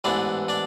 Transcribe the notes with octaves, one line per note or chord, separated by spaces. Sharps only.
A1 G#2 E3 B3 D4 D5
D4 D5